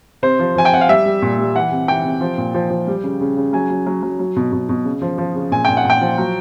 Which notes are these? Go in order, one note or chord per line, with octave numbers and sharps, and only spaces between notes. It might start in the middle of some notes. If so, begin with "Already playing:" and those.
C3 C5
F3
F3 G#5
G5
C3 F#5
F5
G3 E5
G3
A#2
G3
E3 F#5
C3
E3 G5
C3
F3
A#2
F3
F3
G3
C#3
C#3
C#3
F#3 G#5
F#3
F#3
F#3
F#3
B2
B2
B2
C#3
F3
F3
C#3
A#2 G#5
A#2 G5
F#5
A#2
G5
F3
F#3